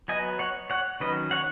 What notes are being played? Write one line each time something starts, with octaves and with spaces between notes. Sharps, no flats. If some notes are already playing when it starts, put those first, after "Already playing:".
F#3 B3 D#5 G#5
C#5 F#5
C#5 F#5
D#3 F#3 C#4 B4 D#5
C#5 F#5